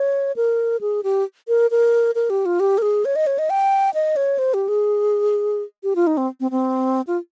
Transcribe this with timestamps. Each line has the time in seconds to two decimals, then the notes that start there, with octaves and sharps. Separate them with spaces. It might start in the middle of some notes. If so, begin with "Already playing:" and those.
Already playing: C#5
0.36 A#4
0.81 G#4
1.04 G4
1.48 A#4
1.71 A#4
2.15 A#4
2.30 G4
2.46 F4
2.60 G4
2.78 A#4
2.82 G#4
3.05 C#5
3.16 D#5
3.27 C#5
3.39 D#5
3.50 G5
3.94 D#5
4.16 C#5
4.38 C5
4.54 G4
4.68 G#4
5.83 G4
5.96 F4
6.07 D#4
6.17 C4
6.40 C4
6.51 C4
7.07 F4